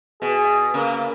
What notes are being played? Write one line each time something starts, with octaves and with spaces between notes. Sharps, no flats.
B2 G#4
C#3 A#3